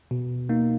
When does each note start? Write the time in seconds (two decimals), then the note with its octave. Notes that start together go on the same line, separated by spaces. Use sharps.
0.11 B2
0.49 A#3 D#4